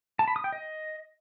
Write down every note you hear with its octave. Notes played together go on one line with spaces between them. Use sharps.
A5
B5
D#6
G5
D#5